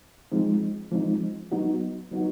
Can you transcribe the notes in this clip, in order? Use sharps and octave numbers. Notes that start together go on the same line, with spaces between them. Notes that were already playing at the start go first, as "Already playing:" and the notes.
F3 G#3 C4 D#4
F3 G#3 C4 D#4
F#3 B3 D#4 F#4
F#3 B3 D#4 F#4